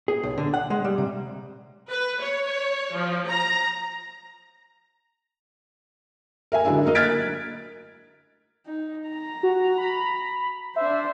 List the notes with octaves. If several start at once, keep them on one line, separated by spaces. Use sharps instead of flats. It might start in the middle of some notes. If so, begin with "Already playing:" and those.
G#4
B1
D3
F#5
G#3
G3
C3
B4
C#5
F3
A#5
A#4 E5 G#5
D3 F#3 G#3 D4 E4
F#3 A3 A#3 A#4 D#5
F6 F#6 G#6 A6 B6 D7
D#4
A#5
F#4
B5
D4 C5 E5